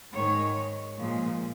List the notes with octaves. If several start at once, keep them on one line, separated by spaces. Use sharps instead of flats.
G#2 D#3 G#3 C#5
A#2 F3 G#3